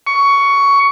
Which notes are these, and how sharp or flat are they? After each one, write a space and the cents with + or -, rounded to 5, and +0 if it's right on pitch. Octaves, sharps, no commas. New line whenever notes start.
C#6 +15